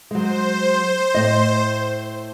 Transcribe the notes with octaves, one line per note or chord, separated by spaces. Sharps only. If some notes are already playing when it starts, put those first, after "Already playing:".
F#3 G#3 C5
A2 D#5